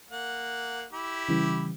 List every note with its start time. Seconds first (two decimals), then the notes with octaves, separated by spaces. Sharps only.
0.10 A#3 F#5
0.92 E4 G4
1.29 C#3 E3 G3